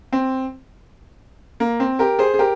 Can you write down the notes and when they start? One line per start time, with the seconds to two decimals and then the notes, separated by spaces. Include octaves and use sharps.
0.13 C4
1.60 A#3
1.80 C4
1.99 G4 A#4
2.19 G#4 C5
2.34 G#4
2.39 G4 A#4